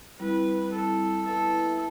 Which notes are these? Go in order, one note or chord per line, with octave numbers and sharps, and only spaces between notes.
G3 C4 E4 B4
A4
B3 E4 A4 B4 E5